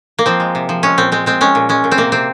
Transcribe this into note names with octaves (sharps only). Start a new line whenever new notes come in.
A#3
F3 C4
G#3
C3
F3
G#3 C#4
A#2 C4
G#3 C4
G#3 C4
G#3 C#4
A#2
G#3 C#4
A#2
C4
C3 A#3
C3 C4